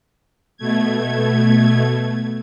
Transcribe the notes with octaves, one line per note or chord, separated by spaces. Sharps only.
B2 A3 G#6